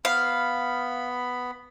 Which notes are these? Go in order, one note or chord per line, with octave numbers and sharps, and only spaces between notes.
B3 F5 B5